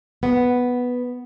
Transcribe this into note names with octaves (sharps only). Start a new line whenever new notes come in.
B3